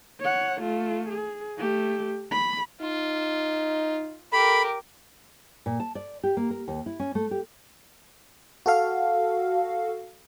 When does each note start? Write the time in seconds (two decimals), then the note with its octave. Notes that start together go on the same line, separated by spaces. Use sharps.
0.20 C#5 F#5
0.61 A3 F4
1.09 G#4
1.58 A3 G4
2.31 B5
2.82 D#4 F4
4.33 G4 A4 A#4 B5
5.66 A#2
5.80 A5
5.95 D5
6.24 G4
6.37 A#3
6.50 A#4
6.68 D#2
6.86 E4
7.00 C#4
7.15 A3
7.31 G4
8.66 F#4 A4 F5